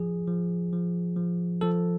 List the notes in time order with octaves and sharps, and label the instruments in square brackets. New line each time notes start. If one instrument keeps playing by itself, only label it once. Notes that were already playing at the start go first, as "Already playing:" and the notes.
Already playing: [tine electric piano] F3 G#4
F3
F3
F3
F3 A4